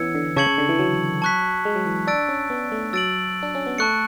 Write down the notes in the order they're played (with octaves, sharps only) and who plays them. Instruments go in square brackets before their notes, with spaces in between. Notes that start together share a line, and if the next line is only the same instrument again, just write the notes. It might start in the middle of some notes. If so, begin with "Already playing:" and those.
Already playing: [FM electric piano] E3 B3 C#4 [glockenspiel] E6 G#6 C#7
[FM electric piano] D3
[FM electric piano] C#3 [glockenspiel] A5 C#6 G#6 C#7 F#7
[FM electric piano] C#3
D3
E3
F#3
[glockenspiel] A5 C#6 F#6 B6
[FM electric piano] G#3
F#3
E3
[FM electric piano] D4 [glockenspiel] E6 A6 D7
[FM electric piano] C#4
B3
A3
[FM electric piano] F#3 [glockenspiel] E6 A6 D7 F#7
[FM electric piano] D4
C#4
B3
[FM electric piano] A3 [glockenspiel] A5 C#6 F#6 C#7